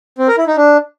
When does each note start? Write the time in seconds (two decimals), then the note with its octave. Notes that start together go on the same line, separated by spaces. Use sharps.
0.19 C4
0.28 A#4
0.38 E4
0.47 D#4
0.57 D4